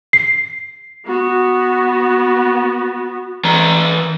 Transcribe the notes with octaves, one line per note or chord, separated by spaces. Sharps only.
C7
B3 F#4
E3 A#5